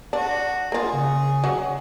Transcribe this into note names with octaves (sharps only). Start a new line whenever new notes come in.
D4 F#4
A#3 F4 G#4
C#3
F#3 F#5